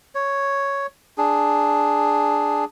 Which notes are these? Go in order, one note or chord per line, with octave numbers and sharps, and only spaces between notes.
C#5
D4 G#4